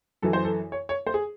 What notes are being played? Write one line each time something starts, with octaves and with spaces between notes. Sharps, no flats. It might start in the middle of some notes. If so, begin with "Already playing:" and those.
F#2 E3 A4
C5
A4
C#5
C#5
C5
G#4